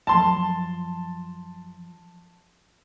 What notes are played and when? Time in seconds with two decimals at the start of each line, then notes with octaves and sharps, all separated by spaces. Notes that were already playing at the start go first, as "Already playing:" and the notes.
0.07 F#2 F3 A5 C6